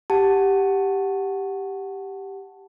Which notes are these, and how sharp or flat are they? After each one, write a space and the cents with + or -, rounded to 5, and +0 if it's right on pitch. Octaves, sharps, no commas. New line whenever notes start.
G4 +0 F#5 +0 A5 +0